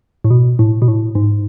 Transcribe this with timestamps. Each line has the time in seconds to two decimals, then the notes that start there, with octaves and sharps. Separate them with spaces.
0.25 A2
0.30 B2
0.59 A2
0.82 B2
0.88 A2
1.15 G#2